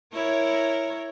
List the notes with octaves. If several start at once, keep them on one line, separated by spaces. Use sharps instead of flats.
E4 A#4 C#5